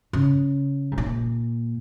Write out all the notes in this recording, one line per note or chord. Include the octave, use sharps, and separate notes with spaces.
C#3
G#2
A#2